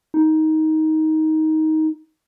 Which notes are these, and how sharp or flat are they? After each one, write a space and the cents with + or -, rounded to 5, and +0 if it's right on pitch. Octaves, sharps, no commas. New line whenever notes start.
D#4 +15